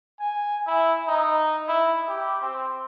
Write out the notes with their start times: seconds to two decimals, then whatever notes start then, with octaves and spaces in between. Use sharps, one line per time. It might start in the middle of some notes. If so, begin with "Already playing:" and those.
0.20 G#5
0.66 E4
1.07 D#4
1.68 E4
2.08 G4
2.41 C4